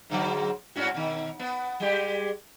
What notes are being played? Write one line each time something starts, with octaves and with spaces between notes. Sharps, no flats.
G#2 D3 F#3
G#2 C#4 F#4
B2 D#3
B3
G3 G#3 G4